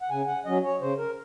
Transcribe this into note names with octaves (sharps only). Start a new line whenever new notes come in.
F#5
C#3 G#5
F#5
F#3 C#4 D#5
C#5
C#3 C5
A#4